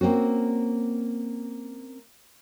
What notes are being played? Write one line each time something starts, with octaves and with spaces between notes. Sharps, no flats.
A#3 C4 C#4 F#4